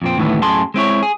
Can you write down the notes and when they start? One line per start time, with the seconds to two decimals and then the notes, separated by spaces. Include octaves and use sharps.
0.02 F2 A#2 C4
0.18 D2 A2 D#3 E3 A3 B3
0.42 F#2 A2 E4 G#4 A5 C6
0.74 G#3 C4 E4 C#5
1.03 G#4